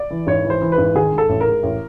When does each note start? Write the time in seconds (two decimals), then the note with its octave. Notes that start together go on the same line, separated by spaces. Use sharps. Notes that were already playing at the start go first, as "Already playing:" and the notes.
Already playing: D5
0.10 E3
0.27 G#1 C#5
0.45 E3
0.50 C5
0.62 E3
0.72 B4
0.78 G#1
0.95 D#3 G#4
1.12 G#2
1.18 A4
1.29 A1
1.41 A#4
1.47 G#2
1.63 A1